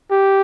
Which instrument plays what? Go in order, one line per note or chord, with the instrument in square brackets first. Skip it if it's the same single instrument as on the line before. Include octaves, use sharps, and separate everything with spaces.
[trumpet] G4